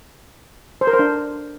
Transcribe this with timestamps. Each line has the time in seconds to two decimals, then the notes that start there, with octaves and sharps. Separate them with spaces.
0.81 C5
0.87 A#4
0.93 C5
0.99 D4